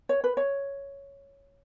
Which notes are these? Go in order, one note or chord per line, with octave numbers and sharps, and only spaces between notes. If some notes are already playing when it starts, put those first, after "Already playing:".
C#5
B4
C#5